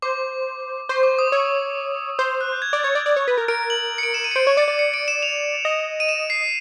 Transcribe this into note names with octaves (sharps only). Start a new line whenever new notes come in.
C5 D6
C5 C#6
D6
D#6
C#5 E6
C5 D#6
F#6
G6
G#6
D5
C#5 A6
D5
D5
C#5
B4
A#4
A#4 D7
F#7
C#7
D7
E7
D#7
C#7
C5 D7
C#5
D5 C#7
D5
C#7
D7
E7
F7
D#5
D#7
E7
C7